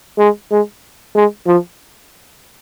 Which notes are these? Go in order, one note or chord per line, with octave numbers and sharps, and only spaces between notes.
G#3
G#3
G#3
F3